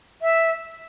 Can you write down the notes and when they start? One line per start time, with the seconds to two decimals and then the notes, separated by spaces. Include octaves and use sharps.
0.22 E5